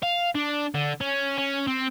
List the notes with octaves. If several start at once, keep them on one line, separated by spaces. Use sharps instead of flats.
F5
D4
D3
C#4
C#4
C4